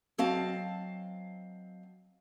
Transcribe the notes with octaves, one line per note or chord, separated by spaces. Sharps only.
F#3 C4 D#5 F5 A5